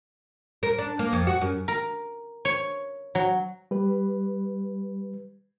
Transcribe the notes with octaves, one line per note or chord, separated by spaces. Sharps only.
A#4
D4
A#3
F2
F#4
F#2
A#4
C#5
F#3
G3 B4